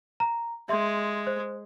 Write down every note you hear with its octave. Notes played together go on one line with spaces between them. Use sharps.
A#5
G#3 E5 C6
C5